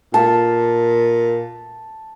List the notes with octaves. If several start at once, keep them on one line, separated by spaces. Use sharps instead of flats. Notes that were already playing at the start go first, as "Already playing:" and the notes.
A#2 A5